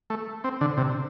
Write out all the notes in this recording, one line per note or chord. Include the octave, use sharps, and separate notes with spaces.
A3
C4
D3
C3